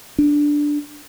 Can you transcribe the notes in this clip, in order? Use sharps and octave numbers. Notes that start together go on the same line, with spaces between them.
D4